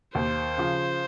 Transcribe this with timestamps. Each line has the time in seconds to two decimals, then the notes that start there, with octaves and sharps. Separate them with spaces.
0.15 D#2 C5
0.58 C#3 F3